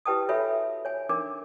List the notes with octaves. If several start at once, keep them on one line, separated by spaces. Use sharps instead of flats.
E4 G4 B4 G5 A5 D#6
F#4 A4 C#5 E5 G#5 B5
C#5 G#5
D4 D#4 A#4 D6